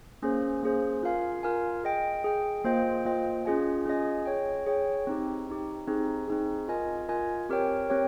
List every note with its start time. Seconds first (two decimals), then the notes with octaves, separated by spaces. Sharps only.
0.22 A#3 C#4 G#4 C5
0.63 A#3 C#4 G#4 C5
1.03 F4 A#4 F5 G#5
1.43 F4 A#4 F5 G#5
1.83 G#4 D#5 G5
2.24 G#4 D#5 G5
2.64 A#3 F4 C5 D#5 G5
3.05 A#3 F4 C5 D#5 G5
3.45 C#4 F4 G#4 D#5 G#5
3.85 C#4 F4 G#4 D#5 G#5
4.26 G#4 C#5 G5
4.67 G#4 C#5 G5
5.07 C4 D#4 G4
5.47 C4 D#4 G4
5.87 C4 D#4 G#4
6.28 C4 D#4 G#4
6.68 F4 A#4 D#5 G#5
7.08 F4 A#4 D#5 G#5
7.49 C4 G4 A#4 C#5 G5
7.90 C4 G4 A#4 C#5 G5